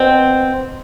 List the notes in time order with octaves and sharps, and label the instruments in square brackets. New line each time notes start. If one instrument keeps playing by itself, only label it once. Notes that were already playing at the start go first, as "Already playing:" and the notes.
Already playing: [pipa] B2 C4